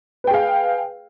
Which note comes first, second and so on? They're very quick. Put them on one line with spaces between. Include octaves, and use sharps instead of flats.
B4 G5 G#4 F5